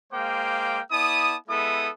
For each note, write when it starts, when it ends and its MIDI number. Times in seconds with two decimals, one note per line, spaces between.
0.12 0.79 56
0.12 0.79 58
0.12 0.79 72
0.12 0.79 77
0.12 0.79 79
0.12 0.79 86
0.91 1.35 59
0.91 1.35 64
0.91 1.35 74
0.91 1.35 81
0.91 1.35 87
1.49 1.89 56
1.49 1.89 59
1.49 1.89 64
1.49 1.89 69
1.49 1.89 76
1.49 1.89 87